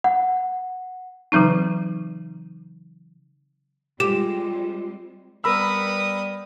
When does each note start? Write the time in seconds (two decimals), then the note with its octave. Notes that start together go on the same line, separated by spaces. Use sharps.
0.04 F#5
1.32 C#3 E3 F#3 C4 D#4
4.00 G3 G#3 C4 F4 G4 E7
5.44 G3 B3 A#4 B5 D#6 E6